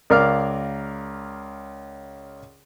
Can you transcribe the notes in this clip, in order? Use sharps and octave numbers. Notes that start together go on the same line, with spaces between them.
C#2 A#4 D5 F5 D6 F6